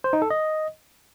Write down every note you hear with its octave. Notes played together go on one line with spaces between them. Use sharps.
C5
D#4
A4
D#5